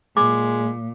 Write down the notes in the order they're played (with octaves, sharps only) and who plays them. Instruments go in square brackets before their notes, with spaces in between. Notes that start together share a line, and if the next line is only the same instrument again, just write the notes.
[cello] A#2 [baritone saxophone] G#3 [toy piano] D6